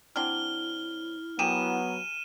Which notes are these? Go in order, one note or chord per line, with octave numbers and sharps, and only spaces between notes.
F#3 C4 D4 E4 F6 G7
F#3 B3 G4 G#4 A#4 D#7 E7